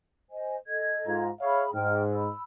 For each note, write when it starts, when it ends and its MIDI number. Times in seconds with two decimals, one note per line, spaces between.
0.31 0.56 72
0.31 0.56 75
0.31 0.56 80
0.67 1.21 69
0.67 1.21 75
0.67 1.21 92
1.07 1.30 44
1.07 1.30 65
1.07 1.30 82
1.41 1.71 68
1.41 1.65 73
1.41 1.65 76
1.41 1.65 77
1.41 1.71 83
1.74 2.29 44
1.74 2.01 79
1.74 2.01 89
2.13 2.42 83
2.13 2.42 88